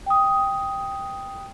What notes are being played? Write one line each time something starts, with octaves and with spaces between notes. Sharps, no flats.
G5 D#6